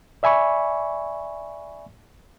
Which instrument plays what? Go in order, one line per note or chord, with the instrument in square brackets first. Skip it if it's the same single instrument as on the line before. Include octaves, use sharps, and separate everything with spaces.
[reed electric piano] D5 E5 G#5 B5 C#6